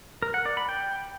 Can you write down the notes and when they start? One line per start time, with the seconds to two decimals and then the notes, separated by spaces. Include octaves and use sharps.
0.22 A#4
0.34 F#5
0.46 D5
0.57 B5
0.69 G5